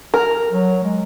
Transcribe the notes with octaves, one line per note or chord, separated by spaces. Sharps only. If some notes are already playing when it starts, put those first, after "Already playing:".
A#4
F#3
G#3